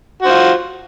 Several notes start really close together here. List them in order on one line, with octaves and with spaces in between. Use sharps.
F#4 C5 F4